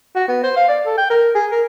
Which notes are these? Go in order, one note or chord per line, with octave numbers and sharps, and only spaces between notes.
F#4
B3
C5
F5
D5
A4
G5
A#4
G#4
A#4